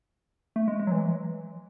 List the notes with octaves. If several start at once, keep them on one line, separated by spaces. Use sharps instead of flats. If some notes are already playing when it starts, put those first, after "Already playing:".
A3
G#3
G#3
F#3
E3